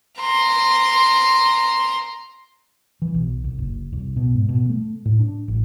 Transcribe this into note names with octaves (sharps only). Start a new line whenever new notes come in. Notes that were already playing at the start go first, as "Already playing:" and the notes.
A#5 C6
E3
B1
C2
F#1
C2
B2
G#2
B2
A3
A2
D4
A1